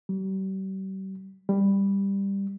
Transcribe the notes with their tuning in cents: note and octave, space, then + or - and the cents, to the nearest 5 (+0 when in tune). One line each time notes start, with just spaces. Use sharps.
G3 -40
G3 +10